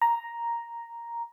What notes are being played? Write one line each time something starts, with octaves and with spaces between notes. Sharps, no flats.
A#5